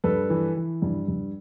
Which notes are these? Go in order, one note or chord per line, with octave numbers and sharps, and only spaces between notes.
G2 A4 B4
E3
E3
G2
G2